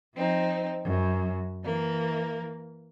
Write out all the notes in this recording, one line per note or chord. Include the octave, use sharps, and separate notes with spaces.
F3 C4 D#4
F#2
E3 A#3